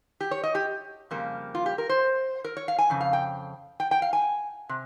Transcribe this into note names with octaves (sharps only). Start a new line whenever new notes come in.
G4
C#5
D#5
G4
F2 C#3 G3 A#3
F4
G4
A#4
C5
A#4
C#5
F5
G#5
F2 C#3
F5
G5
G5
G5
F5
G#5
C3